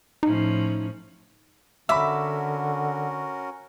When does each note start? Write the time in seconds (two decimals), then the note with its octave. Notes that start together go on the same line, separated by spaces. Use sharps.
0.23 A2 F3 C#4 D#4
1.89 D3 C#4 F#4 A#4 E5 B5 D6 E6